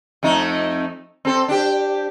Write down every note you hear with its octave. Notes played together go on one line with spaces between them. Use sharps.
F2 A3 D#4
C4 A4
D4 G4